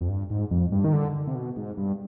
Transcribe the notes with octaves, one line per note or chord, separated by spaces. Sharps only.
F2
G2
G#2
F2
G2
D#3
D3
C3
B2
G#2
G2